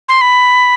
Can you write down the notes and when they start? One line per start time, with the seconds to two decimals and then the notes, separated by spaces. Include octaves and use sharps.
0.09 C6
0.21 B5